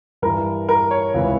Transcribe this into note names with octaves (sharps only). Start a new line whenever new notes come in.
G2 E3 A#4
A#4
C#5
C#2 C3 E3